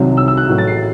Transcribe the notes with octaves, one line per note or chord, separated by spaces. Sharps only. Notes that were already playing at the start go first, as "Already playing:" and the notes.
Already playing: C2 C3 D#3 F#3
E6
E6
F#6
A1 A2 F#3
A6
C7